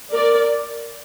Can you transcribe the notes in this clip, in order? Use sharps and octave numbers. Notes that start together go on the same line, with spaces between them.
A#4 D5